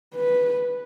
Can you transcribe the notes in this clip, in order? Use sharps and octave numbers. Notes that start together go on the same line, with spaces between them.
B4